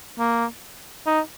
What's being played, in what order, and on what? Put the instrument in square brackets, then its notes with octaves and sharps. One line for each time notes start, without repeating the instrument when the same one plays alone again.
[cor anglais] A#3
D#4